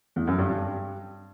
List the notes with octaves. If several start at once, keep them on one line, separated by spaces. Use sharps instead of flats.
E2
F#2
G2
G2